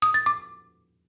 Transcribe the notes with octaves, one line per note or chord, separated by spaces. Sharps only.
D#6
A6
D6